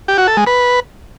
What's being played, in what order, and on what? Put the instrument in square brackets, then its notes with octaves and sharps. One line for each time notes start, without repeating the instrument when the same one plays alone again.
[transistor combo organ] G4
F#4
A4
G#3
B4